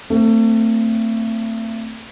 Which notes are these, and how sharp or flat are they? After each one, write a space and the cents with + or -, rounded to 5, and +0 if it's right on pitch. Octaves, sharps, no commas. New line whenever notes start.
A3 +35 C4 +0